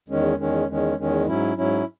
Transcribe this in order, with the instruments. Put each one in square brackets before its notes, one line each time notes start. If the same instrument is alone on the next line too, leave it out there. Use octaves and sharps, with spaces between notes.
[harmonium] E2 D#3 G#3 C#4
E2 D#3 G#3 C#4
E2 D#3 G#3 C#4
E2 D#3 G#3 C#4
G#2 F#3 C#4 E4
G#2 F#3 C#4 E4